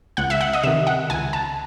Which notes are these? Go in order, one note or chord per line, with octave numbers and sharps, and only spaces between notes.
C#2 F#5
E5
F#5
D#5
C3 D#3 E5
F#5
C#2 G#5
A5